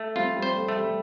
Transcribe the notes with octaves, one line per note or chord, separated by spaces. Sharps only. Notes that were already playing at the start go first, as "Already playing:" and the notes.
Already playing: A3
G3 C4 F4
G3 C4
C5
A3
A3
G3